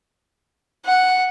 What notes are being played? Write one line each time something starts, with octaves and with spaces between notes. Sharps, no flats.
F#5